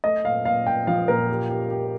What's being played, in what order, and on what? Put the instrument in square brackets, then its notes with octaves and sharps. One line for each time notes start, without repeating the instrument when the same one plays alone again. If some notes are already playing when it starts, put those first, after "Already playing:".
[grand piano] A3 [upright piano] D#5
[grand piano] A#2 [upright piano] F5
[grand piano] A#2 [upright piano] F5
[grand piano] A#2 [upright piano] G5
[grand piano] F3 [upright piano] F5
[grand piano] A#2 [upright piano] A#4
[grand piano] G4
G4
G4